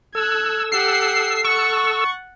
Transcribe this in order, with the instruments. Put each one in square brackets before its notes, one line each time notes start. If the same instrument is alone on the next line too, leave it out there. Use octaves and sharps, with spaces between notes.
[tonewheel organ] A4 E6 [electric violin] F#6 G#6
[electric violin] G4 F#5 [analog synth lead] C7
[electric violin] F#5 A6 [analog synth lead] C#6